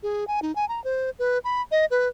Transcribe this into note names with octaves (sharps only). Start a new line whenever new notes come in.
G#4
G#5
D#4
G#5
A#5
C5
B4
B5
D#5
B4